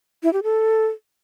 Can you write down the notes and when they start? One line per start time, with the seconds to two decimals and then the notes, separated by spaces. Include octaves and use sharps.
0.23 E4
0.33 G4
0.43 A4